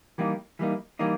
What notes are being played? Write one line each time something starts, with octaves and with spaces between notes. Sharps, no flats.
E3 G3 A#3 D#4
E3 G3 A#3 D#4
E3 G3 A#3 D#4